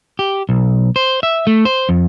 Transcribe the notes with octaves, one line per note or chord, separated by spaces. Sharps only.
G4
B1
C5
E5
A3
C5
F2